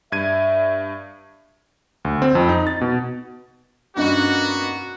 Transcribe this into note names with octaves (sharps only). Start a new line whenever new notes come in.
G2 E5 G#6 D#7
D2
C4
F2
D#4
A6
B2
G2 A#3 B3 C#4 D#4 F#4